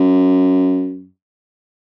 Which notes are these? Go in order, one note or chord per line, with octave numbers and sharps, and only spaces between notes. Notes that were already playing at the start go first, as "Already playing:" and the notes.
Already playing: F#2